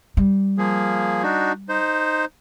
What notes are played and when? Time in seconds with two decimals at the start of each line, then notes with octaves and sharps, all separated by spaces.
0.17 G3
0.58 F3 A#3 G#4
1.23 D4 D#4 F#4
1.69 D#4 C5